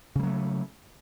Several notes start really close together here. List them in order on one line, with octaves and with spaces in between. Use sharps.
C#3 G3 F#3 A3